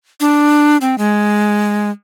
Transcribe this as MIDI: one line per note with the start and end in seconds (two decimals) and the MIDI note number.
0.20 0.77 62
0.81 0.98 60
0.98 1.90 56